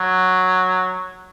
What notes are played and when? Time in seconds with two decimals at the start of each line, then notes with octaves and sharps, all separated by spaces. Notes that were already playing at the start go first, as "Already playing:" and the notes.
Already playing: F#3